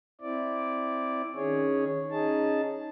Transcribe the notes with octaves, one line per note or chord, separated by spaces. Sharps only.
C4 E4 D5
D#3 C#4 G#4 C#5
C#4 D#4 G#4 A5